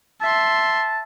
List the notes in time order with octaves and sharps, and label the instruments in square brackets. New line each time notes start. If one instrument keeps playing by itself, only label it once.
[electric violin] E5 C6 [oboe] A5